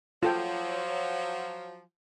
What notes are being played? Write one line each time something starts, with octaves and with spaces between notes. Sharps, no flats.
F3 F#3 F4 A4 G5